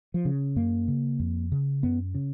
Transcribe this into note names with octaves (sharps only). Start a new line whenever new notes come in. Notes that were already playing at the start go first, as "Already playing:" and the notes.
F3
C#3
F#2 A#3
C#3
F2
C#3
F#2 B3
C#3